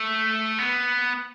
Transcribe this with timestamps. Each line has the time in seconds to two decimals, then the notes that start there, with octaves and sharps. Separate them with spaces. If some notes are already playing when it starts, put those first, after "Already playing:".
Already playing: A3
0.59 B3